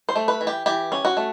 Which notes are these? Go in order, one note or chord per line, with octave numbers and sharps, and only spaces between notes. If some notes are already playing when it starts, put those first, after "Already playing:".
C5
A3
B4
E3
G4
E3 G4
C#4
F#4
A3